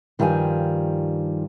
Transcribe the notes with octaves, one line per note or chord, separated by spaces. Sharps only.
G2 D#3 F3 G3 F4 G#5